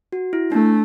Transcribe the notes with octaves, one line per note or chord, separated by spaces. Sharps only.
F#4
E4
A3 D4